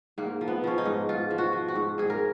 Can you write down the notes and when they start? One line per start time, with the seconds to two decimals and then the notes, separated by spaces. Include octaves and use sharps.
0.18 G#2 A#3
0.41 F3
0.48 B3
0.64 F3 C#4
0.78 D#4
0.85 G#2
1.09 G#2 F4
1.31 F3
1.38 F#4
1.53 F3
1.68 F#4
1.75 G#2
1.98 G#2 G#4
2.10 A#4